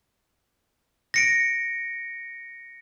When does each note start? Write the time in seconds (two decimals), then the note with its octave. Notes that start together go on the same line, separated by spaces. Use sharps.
1.14 A#6 C#7 D7